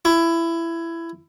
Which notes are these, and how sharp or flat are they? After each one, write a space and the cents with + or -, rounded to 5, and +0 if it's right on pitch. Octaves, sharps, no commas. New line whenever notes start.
E4 +15